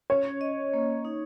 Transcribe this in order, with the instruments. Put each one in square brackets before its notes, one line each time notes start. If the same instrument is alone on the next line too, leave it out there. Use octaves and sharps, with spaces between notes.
[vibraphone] C#4 [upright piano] C#5
[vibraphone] D#5
A#3
D#4